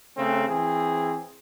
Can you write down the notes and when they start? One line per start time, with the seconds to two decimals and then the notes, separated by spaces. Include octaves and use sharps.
0.17 C#3 A3 C4
0.48 E3 C4 G#4